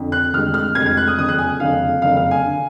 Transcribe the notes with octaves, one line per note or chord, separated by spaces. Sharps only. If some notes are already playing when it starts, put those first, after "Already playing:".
Already playing: F2 D3
F#6
F1 F2 D3 G#3 F6
F6
F1 F2 D3 G#3 G#6
G#6
F#6
D#6
F#1 F2 D3 D#6
F#6
G#5
F#1 F2 D3 F5
F#1 F2 D3 F5
F5
G#5
D3